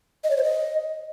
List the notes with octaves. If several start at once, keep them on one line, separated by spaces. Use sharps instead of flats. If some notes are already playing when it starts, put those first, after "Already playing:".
D#5
C#5
C5
D#5